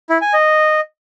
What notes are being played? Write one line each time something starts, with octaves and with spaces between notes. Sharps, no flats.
E4
G#5
D#5